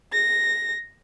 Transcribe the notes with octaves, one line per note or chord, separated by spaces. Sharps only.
A#6